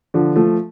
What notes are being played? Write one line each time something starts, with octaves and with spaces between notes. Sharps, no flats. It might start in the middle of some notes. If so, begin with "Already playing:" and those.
D3 F3
F3 A3